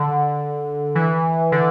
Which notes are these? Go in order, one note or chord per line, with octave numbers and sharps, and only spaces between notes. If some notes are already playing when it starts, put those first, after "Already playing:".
Already playing: D3
E3
D3